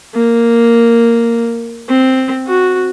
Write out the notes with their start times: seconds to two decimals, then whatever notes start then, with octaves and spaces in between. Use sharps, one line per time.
0.14 A#3
1.88 C4
2.48 F#4